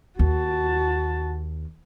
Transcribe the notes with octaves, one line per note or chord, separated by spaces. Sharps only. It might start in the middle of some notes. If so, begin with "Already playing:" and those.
D#2 F#4 A5